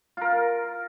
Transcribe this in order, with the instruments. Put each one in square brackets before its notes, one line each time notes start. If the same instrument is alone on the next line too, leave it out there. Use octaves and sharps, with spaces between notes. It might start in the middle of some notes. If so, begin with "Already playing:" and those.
[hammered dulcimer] F4 A#4